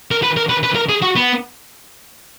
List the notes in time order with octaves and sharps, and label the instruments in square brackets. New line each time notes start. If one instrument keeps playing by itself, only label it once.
[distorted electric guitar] A#4
B4
A#4
B4
B4
A#4
G#4
F#4
B3